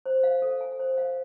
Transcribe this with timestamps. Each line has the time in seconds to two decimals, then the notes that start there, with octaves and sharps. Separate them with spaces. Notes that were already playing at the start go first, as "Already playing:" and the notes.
0.06 C5
0.23 F5
0.42 A4
0.61 G#5
0.79 C5
0.98 F5